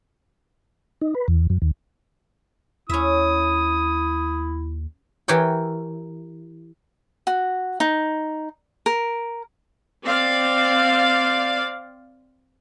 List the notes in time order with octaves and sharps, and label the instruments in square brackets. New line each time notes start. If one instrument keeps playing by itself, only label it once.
[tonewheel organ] D#4
B4
E2
F#2
D#2
[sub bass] D#2 [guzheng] C#4 E5 [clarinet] E4 [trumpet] D#6
[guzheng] E3 G4 A#4 C#5 G5
[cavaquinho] F#4
D#4
A#4
[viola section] C4 D5 F5